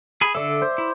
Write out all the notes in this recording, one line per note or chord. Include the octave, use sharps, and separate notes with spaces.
G#4 B5
D3 A4 D5 E5
C5
E4